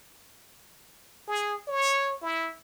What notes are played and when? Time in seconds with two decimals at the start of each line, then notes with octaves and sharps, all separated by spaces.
1.28 G#4
1.68 C#5
2.22 E4